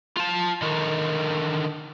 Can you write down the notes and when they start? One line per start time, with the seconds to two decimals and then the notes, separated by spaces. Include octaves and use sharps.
0.17 F4 A5
0.62 D3 D#3